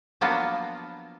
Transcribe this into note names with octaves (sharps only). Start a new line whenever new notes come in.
F3 F#3 A#3 B3 D4 F4